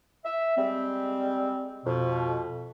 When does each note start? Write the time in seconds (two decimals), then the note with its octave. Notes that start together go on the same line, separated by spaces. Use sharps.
0.25 E5
0.57 G3 G#3 C4
1.85 F2 B2